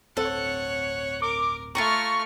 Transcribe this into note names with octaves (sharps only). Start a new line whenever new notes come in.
D1 G1 C4 A4 C#5 F#5
A#4 D6
A3 F4 F#4 A#5 C#6 F6